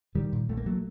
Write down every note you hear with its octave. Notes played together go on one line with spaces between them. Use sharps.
A#2 D#3 G3
A#2
A#1 A3
A#3
F#3 A3